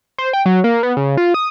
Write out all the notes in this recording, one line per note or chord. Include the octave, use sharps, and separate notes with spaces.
C5
G5
F#3
A#3
B3
C#3
F4
D#6